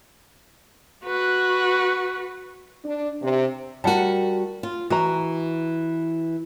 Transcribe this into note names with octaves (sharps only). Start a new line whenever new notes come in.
F#4 B4
D4
C3
G3 F#4 A#4 F#5 A5
F4
E3 F#4 A#5